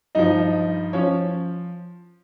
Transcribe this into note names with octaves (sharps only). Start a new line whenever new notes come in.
G2 F3 D#4 D#5
F3 C#4 C#5